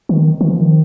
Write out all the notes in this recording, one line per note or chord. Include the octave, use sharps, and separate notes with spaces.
D#3
D#3
F3
D#3